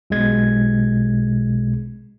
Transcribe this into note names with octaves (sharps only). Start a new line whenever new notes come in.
B1 B2 G#3 G#6